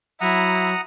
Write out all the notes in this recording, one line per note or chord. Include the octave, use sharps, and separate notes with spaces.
F#3 E4 F#5 A#5 D#6